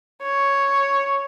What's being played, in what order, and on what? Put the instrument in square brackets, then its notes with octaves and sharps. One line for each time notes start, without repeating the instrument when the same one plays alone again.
[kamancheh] C#5